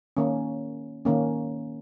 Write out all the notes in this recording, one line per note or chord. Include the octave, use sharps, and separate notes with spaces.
D#3 A#3 C#4
D#3 A#3 C#4